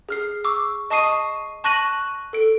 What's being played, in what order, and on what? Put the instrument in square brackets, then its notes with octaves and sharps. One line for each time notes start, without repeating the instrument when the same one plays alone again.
[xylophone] G#4 F6 C7
C#6 D6 E6
D#5 A5 C#6 D#6 C7 D#7
A5 C#6 F#6 A#6 D#7 F#7
A4 D7